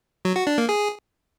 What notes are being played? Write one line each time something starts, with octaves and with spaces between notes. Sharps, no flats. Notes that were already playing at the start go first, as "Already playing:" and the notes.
F#3
F#4
D4
A#3
G#4